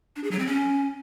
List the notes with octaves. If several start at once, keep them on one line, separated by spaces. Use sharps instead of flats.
D4
G#4
F#3
C4
C#4